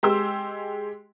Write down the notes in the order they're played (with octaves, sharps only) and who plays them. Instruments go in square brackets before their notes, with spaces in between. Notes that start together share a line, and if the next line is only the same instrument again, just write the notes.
[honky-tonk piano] G#3 G4 C6 E6